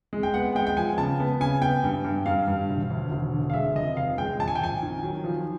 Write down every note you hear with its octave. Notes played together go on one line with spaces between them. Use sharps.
G#3
G5
B3 F#5
G#3 G5
G5
F3 G#5
C#3 A5
B3
C#3 G#5
B3 G5
G2
G2
G2 F5
G2
E1
D2
E1
D3
F5
G#3 E5
F1 D#5
F1 F5
G#3 G5
A#1 A5
G#5
G5
A#1 G#5
D#3
F#3
F3